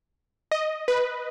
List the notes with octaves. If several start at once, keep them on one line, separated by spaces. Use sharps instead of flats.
D#5
B4